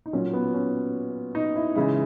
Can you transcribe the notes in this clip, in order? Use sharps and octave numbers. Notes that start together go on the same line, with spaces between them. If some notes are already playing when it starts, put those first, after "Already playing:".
D#4
A#2 F#3 C#4
B3
C#4
D#4
E4
C#3 E3 G#3 E4